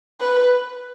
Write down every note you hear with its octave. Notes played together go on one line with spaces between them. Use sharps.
B4